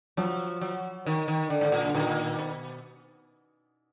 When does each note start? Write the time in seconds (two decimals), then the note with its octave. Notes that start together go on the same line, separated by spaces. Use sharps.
0.17 F3 F#3
0.61 F#3
1.06 D#3
1.28 D#3
1.50 D3
1.61 G#2
1.72 A#2
1.86 D3
1.94 A#2 D#3
2.39 B2